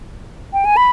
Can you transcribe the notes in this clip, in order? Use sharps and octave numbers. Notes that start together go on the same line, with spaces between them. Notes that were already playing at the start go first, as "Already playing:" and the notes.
G5
G#5
B5